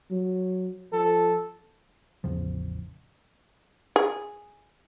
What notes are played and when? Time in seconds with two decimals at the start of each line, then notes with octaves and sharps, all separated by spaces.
0.11 F#3
0.93 F3 A4
2.24 A1 E2 C#3 F3
3.96 G#4